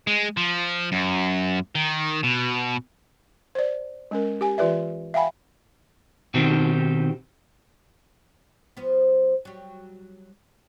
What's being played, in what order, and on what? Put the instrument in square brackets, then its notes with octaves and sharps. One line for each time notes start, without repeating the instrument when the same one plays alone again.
[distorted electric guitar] G#3
F3
F#2
D#3
B2
[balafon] C5 D5
G#3 C#4 A#4
G4 G#5
E3 F4 G4 B4 D5 E5
E5 F5 G5 G#5 B5
[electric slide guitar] B2 D#3 C4 D#4 G4
[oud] F3 B3
F#3 G3